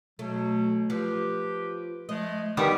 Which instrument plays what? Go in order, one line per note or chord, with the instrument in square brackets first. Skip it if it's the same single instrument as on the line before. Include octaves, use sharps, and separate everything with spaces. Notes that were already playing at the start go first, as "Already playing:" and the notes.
[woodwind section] B2 F#3 [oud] A3
[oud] F3 [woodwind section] G4 B4
[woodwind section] F3 G#3 A3 [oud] D#5
[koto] D#3 G3 B3 [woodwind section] A#4 D6